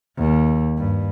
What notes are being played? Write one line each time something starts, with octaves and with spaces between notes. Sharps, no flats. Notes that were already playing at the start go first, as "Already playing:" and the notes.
D#2
G2